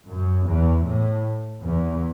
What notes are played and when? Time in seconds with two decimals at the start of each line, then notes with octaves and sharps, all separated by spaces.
0.09 F#2
0.47 E2
0.86 A2
1.62 E2